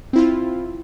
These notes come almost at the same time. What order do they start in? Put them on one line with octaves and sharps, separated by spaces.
C4 E4 F4